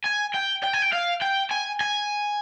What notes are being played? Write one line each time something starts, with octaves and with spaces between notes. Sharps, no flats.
G#5
G5
G5
G#5
G5
F5
G5
G#5
G#5